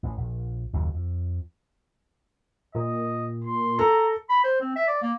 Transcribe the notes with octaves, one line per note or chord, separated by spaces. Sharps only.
A1
A#1
F#1 D#2 A#2 C#3
F2
A#2 D#5
C6
A4 A#5
B5
C5
C4
E5
D5
A#3